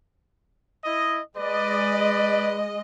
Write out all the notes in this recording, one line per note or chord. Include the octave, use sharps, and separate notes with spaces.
E4 D#5
G#3 B4 D5 D#5